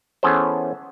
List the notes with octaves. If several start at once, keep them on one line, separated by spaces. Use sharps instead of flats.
E3 B3 C#4 G#4 A4 C5